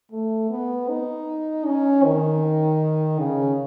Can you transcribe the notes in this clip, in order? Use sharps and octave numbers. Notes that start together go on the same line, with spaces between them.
A3
B3
D#4
C#4
D#3
C#3